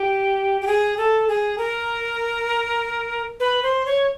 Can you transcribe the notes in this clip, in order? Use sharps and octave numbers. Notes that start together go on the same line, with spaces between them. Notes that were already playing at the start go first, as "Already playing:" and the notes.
Already playing: G4
G4
G#4
A4
G#4
A#4
B4
C5
C#5